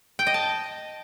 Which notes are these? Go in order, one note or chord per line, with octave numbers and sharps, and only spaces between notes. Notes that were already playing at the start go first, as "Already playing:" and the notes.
G5
D#5
A5